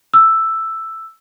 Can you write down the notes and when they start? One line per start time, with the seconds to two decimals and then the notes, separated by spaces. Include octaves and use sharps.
0.14 E6